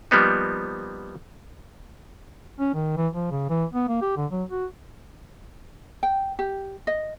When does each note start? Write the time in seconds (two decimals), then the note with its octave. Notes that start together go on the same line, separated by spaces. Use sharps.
0.11 F3 G3 A#3 B3 D#4
2.60 C#4
2.74 D#3
2.97 E3
3.14 F3
3.31 C#3
3.49 E3
3.74 B3
3.88 A#3
4.01 G4
4.17 D3
4.31 F#3
4.50 F#4
6.03 G5
6.39 G4
6.87 D#5